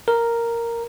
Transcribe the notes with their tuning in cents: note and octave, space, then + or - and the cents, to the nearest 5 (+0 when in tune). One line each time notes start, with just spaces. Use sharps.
A#4 -5